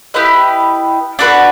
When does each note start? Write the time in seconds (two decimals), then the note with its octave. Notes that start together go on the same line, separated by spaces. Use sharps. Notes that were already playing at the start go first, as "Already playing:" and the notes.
0.14 E4 G4 B4 D#5
1.19 D4 F#4 B4